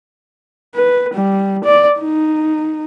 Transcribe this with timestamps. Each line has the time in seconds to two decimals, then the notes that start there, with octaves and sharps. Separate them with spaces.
0.75 B4
1.14 G3
1.65 D5
2.00 D#4